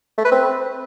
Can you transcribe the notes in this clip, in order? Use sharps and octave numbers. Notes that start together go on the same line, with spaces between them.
A3
B4
C4